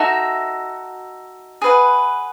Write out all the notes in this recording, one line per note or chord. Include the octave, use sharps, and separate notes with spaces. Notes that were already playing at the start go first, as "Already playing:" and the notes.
Already playing: D#4 F#4 A4 E5
G#4 B4 F#5